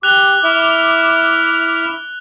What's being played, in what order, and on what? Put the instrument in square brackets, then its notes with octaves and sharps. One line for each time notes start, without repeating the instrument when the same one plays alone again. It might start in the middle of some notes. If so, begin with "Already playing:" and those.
[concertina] G4 [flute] D6 [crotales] F#6 F7 G7
[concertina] E4 E5 F6